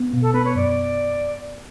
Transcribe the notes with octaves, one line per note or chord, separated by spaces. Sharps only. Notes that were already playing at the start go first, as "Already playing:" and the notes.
Already playing: B3
B2
A4
B3 B4
C#5
F#2 D5